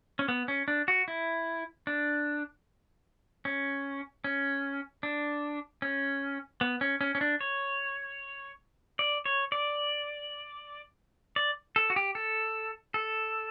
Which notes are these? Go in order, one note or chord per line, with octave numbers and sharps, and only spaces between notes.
C#4
B3
C#4
D4
F#4
E4
D4
C#4
C#4
D4
C#4
B3
C#4
C#4
C#4
D4
C#5
D5
C#5
D5
D5
A4
F#4
G4
A4
A4